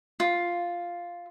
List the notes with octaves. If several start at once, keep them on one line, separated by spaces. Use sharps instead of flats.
F4